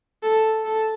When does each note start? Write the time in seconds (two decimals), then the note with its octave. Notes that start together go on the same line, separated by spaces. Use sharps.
0.23 A4
0.66 A4